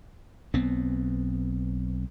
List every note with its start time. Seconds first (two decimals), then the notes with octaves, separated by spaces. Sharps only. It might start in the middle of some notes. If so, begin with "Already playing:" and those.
0.54 B1 B3 C4